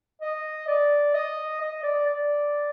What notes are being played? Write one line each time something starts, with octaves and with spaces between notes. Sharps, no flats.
D#5
D5
D#5
D#5
D5
D5